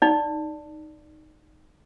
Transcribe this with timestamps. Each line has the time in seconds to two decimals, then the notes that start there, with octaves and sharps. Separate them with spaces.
0.02 D#4 D5